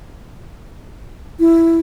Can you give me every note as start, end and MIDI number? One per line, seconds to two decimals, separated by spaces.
1.40 1.79 64